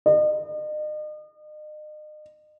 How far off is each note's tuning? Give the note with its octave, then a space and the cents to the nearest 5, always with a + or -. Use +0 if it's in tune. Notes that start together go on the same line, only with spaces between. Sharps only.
D#5 -40